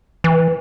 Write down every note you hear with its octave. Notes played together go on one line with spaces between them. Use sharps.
E3